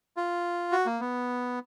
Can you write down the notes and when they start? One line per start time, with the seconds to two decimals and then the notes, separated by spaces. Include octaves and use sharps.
0.17 F4
0.72 F#4
0.86 A#3
1.00 B3